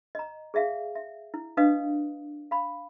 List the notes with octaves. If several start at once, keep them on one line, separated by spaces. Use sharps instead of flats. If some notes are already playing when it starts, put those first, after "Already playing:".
D#5 A#5
G#4 D5 E5 F5
E5
E4
D4 B4 D#5 F5 D#6
F5 B5